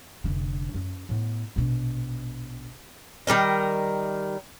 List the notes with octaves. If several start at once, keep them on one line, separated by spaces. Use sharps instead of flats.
F1 D3
F#2
A2 B3
A#1 B2
D#3 G3 A#4 D#5